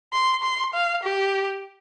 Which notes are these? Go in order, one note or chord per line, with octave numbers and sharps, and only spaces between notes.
C6
C6
F5
G4